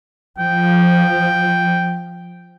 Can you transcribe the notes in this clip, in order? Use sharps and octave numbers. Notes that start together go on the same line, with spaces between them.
F3 G5